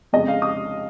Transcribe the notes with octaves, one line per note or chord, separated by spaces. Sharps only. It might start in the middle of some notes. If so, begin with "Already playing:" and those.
F2 C#3 G#3 D#5
F5
D#6